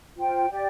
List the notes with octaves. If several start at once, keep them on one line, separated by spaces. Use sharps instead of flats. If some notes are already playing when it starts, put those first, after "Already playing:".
F4 C5 G5
G4 D5 G5